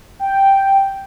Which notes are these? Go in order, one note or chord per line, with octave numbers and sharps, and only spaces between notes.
G5